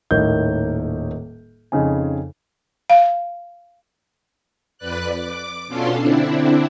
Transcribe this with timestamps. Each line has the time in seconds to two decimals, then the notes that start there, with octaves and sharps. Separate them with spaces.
0.11 D#1 A2 A#3 D#4 G6
1.72 F2 C#3 D#4 G#5
2.90 F5
4.78 F2 B4 D5 F#6
5.15 D6
5.67 B2 C#4 D4 F4 A4 C6
5.99 D3 C4 D4 E4